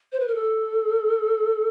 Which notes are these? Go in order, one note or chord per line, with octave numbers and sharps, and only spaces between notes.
C5
B4
A#4
A4